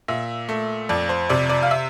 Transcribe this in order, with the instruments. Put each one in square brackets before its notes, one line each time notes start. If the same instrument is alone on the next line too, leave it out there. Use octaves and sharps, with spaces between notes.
[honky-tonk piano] A#2 E5
A3
F2 D5
C5
C3 D5
D5
F5
E5